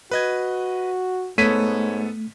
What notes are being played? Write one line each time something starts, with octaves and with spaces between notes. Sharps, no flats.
F#4 B4 D#5 G#6
G#2 A3 B3 A4 C#5 B6 D#7